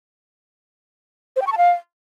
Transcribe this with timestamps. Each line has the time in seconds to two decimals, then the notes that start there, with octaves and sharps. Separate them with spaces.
1.36 C5
1.42 G5
1.47 C#6
1.52 A5
1.58 F5